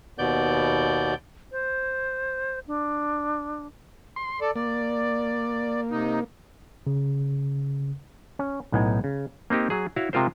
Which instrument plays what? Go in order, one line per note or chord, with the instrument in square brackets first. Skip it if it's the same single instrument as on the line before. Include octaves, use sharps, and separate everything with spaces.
[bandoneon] D#2 B2 B3 D5 G6
[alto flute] C5
D4
[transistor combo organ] C6
[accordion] A4 D5
[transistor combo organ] A#3 [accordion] D5
[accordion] C3 D#4
[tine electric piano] C#3
[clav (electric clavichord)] C#4
B1 A2 B3 D#4 G#5
C#3
A#3 C4 D#4 G4
F#3 G#4
E4 F#4 C#5 F5
C3 G#3 F4 A#4 C5